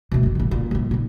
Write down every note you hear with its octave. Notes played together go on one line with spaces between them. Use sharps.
B2 A3
F#1 D2
A1 B2
A#2
A#1 A#2
A#2 D#4